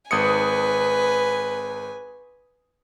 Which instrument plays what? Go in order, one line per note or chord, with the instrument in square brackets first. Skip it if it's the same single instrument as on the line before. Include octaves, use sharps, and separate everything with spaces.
[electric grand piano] G#1 D#6 C#7 [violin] B4 G#5